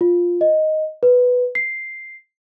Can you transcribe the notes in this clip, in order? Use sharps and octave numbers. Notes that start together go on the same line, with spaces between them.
F4
D#5
B4
C7